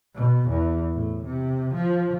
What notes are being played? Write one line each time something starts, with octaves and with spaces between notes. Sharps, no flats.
B2
E2
A2
C3
F3